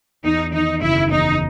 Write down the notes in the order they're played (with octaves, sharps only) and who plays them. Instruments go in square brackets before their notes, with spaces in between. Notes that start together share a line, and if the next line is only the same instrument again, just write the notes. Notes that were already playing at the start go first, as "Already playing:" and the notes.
[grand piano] E2 [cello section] D#4
[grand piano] D#3 [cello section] D#4
[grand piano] F#1 [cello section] E4
[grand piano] E2 [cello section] D#4